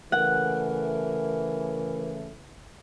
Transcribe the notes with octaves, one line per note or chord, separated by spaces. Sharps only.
C#3 E3 A3 A#4 F#5